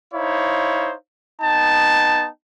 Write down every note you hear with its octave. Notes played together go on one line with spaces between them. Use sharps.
D#4 E4 C5 C#5 F5
B3 D#4 G5 A5